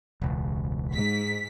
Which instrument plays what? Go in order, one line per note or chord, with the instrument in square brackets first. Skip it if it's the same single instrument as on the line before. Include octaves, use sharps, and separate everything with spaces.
[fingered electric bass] E1 C#2
[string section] G#2 B6